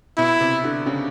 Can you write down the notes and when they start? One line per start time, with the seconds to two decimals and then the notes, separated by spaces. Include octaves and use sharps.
0.18 B2 E4
0.40 C3
0.64 D3
0.86 C#3